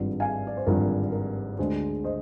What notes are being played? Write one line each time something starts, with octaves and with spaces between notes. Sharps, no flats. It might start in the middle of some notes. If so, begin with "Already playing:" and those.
Already playing: G#1 G2 F3
F5 G#5
D5
C5
G#1 G2 F3 A#4
A#4
D2 D3 G#3 C5
C5 D#5